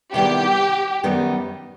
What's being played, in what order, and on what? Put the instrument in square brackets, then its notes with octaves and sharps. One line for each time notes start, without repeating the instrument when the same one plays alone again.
[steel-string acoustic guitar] C3 D#3 G3 B3 E4 [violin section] G4
[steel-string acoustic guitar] F#2 D#3 G3 B3